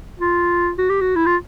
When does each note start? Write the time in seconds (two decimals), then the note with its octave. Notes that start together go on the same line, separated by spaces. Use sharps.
0.19 F4
0.78 F#4
0.89 G4
1.01 F#4
1.16 E4
1.26 F4